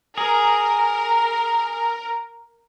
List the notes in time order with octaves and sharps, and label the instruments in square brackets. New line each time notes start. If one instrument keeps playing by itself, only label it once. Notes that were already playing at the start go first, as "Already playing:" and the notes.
[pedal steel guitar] G#4 [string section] A#4